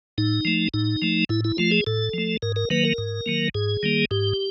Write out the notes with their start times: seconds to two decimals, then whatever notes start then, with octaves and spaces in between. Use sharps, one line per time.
0.18 A2 D#4
0.45 F3 A3
0.74 A2 D#4
1.02 F3 A3
1.29 A2 E4
1.45 E4
1.58 F3 A3 F4
1.71 G#4
1.87 A2 A4
2.14 F3 A3
2.42 G#2 A#4
2.56 A#4
2.70 D#3 F#3 A#3 B4
2.85 A#4
2.98 G#2
3.26 D#3 F#3 A#3
3.54 G#2 G#4
3.83 D#3 G3 A#3
4.11 G#2 G4